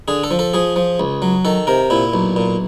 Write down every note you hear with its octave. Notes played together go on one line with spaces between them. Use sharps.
D3 G#4
A4
F3
A4
F3 G#4
F3
C#2
F#3
D#3 A4
C3 A#4
A#2 E4
B1
A#2